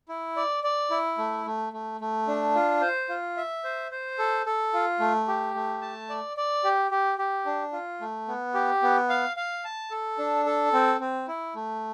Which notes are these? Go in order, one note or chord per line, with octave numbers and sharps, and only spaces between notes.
E4
D5
D5
E4
A3
A3
A3
A3
D4
F4
C5
F4
E5
C5
C5
A4
A4
F4
A3
G4
A3
A5
D5
D5
G4
G4
G4
D4
F4
A3
B3
G4
B3
F5
F5
A5
A4
D4
A4
C4
C4
E4
A3